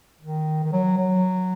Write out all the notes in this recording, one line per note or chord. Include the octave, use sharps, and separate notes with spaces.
D#3
D#3
F#3
F#3